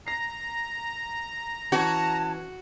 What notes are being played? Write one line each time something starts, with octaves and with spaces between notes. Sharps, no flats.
A#5 A#6 C7
E3 C#4 F#4 A5